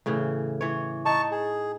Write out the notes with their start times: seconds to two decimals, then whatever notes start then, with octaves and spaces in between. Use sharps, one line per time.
0.06 A2 C#3 E3
0.61 E3 C#5
1.06 D#4 A5 C#6
1.31 G#4